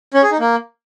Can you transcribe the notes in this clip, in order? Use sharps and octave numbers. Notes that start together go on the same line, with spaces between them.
C#4
G#4
D#4
A#3